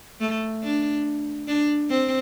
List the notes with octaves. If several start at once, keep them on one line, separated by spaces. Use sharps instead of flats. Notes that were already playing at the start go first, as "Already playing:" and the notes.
A3
D4
D4
C4